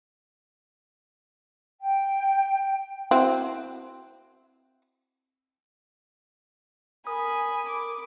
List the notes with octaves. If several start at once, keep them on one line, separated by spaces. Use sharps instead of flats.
G5
C4 E4 F#4
A#4 G#5 B5 D#6
D6